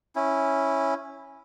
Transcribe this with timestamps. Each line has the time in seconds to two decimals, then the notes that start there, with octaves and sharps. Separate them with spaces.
0.16 C#4 E4